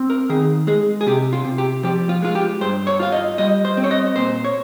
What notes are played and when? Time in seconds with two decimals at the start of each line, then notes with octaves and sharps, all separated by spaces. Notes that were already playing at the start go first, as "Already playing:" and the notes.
Already playing: C4
0.10 A#4
0.29 D#3 G#4
0.67 G#3 G#4
1.01 G#4
1.07 C3 G4
1.33 F4
1.45 C3
1.58 G4
1.83 F3 G4
2.09 F4
2.22 G#3 F4
2.35 G4
2.61 G2 C5
2.87 C#5
3.00 F4 F5
3.12 D#5
3.38 G3 D#5
3.65 C5
3.77 C4
3.84 C#5
3.91 D#5
4.16 A#2 C5
4.45 C#5